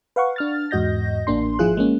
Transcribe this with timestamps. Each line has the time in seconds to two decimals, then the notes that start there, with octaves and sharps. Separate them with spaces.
0.16 B4 F5 F#5 C#6
0.36 D4 F6 A6
0.71 E2 G#2 F#4 D#5 G6 A#6
1.27 A1 A#3 D4 C6
1.59 G#1 F3 E4 F4 G#4 F#6
1.77 G#3 A#3 C#4